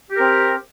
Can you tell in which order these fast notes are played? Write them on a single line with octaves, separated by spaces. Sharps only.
G4 A#4 C4